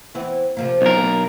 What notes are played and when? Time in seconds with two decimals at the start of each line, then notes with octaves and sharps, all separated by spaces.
0.15 E3 B3 C4
0.57 C3 F3 A#3
0.82 B1 A#4
0.98 G2 A#3 B3